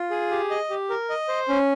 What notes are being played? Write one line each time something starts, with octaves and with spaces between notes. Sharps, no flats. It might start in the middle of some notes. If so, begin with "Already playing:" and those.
Already playing: F4
G#4
G4
D#5
G4
A#4
D#5
C5
C#4